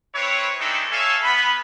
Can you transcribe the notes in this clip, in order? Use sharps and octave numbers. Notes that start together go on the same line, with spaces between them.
C4 E4 B4 C#5
G#3 A3 C4 D4 D#4 A4
A4 C#5 E5 F5 G#5
B3 B5